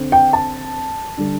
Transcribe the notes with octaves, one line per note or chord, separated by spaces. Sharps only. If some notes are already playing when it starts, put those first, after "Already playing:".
Already playing: D3 C4
G5
A5
D3 G3 D4